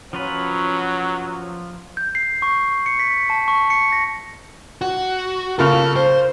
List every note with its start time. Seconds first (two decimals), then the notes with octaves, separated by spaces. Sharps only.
0.13 F3 F#3 C#4 F4 B4
1.97 G6
2.15 C7
2.42 C#6
2.86 C#7
2.99 B6
3.30 A5
3.48 C#6
3.70 C#7
3.92 A#6
4.81 F#4
5.59 C#3 F4 A4 A#4
5.96 C5